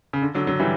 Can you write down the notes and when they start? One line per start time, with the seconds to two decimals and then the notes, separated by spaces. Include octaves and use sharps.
0.13 C#3
0.22 D3
0.35 D3 F#3
0.47 D3 F#3
0.60 E3 G3